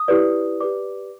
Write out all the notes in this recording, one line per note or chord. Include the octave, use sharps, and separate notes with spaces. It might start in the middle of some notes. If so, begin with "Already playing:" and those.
Already playing: D#6
E4 G4 B4 D5
G4 B4 D5 D6